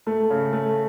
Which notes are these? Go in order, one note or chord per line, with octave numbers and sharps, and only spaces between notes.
A3
C#3
A3